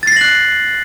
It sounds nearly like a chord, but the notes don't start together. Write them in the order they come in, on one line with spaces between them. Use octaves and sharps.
A6 C7 A#6 F#7 F#6